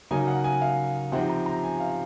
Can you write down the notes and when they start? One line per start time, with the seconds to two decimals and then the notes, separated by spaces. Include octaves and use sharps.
0.11 C#3 F#3 A#3 D#4 G#5
0.28 F#5
0.44 G#5
0.62 F5
1.12 C3 F3 C4 D#4 F#5
1.30 A#5
1.46 A#5
1.63 G#5
1.80 F5